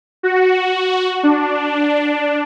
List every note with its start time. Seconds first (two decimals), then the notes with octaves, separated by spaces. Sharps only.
0.23 F#4
1.23 D4